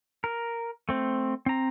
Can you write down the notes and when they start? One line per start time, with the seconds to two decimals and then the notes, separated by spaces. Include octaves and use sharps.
0.24 A#4
0.89 A3 C4
1.46 C4 A#5